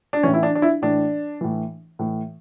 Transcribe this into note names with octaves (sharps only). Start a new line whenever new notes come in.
D4
A2 E3 C#4
E4
D4
D4
E4
A2 E3 D4
A2 E3
A2 E3